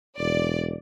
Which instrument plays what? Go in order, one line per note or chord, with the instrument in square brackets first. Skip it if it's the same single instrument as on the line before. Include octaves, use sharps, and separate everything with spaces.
[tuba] E1 [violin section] D5